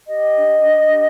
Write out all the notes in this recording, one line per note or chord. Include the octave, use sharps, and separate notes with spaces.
G4 D#5
D4
D4
G4